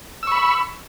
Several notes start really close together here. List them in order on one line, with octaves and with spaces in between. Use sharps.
E6 C#6 B5